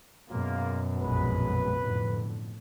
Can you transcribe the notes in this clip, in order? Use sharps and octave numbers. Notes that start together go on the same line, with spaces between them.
F#2 B2 G#3 A#3 F4
A#1 F2 G#3 B4
F2 A2 D3